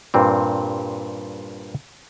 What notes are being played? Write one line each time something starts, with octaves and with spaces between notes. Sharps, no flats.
G2 A#2 C4